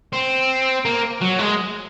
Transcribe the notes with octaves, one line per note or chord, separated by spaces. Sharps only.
C4
A#3
F#3
G#3